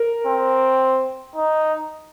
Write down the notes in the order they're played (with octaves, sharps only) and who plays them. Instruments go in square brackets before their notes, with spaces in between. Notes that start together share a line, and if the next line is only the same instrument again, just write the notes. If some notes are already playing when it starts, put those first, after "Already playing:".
Already playing: [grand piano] A#4
[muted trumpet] C4
D#4